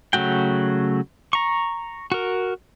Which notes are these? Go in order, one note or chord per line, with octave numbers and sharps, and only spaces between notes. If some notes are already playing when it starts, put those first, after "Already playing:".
C#3 F#3 A3 F#4 G5
A#5 C#6
F#4 A#4